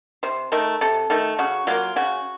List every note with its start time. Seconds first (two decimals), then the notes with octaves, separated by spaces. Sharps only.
0.23 C3 C5
0.52 D#3 A3 A#4
0.81 C3 A4
1.10 D#3 A3 A4
1.39 C#3 F#4
1.67 F#3 A#3 F4
1.96 C#3 F#4